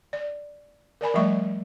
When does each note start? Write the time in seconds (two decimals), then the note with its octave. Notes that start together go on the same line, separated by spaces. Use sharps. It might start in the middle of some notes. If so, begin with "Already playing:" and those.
0.13 D5
1.01 A#4 D5 G#5 B5
1.14 F3 G3 A3 E5 C#6